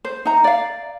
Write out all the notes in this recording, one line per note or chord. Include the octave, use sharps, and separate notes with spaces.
C5
D#4 A#5
D5 F5